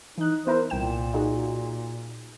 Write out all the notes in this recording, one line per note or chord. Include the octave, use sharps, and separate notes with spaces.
E3 D#4 F#6
B3 E4 A#4 C5
C2 A#2 G5 E7
D#4 F#4 G#4